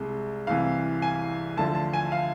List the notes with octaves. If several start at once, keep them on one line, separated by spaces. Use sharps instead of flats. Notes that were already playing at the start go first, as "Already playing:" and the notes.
Already playing: C2 C3 G#3
C2 C3 E3 F5
G#5
D2 D3 F3 A5
A5
G#5
F5